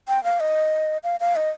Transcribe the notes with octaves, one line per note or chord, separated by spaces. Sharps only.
G5
F5
D#5
F5
F5
D#5